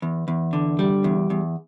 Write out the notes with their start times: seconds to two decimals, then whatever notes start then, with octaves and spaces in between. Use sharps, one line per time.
0.02 E2
0.28 E2
0.53 D3
0.79 G3
1.04 E2
1.30 E2